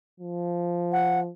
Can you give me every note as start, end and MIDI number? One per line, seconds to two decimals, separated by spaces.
0.20 1.30 53
0.92 1.20 78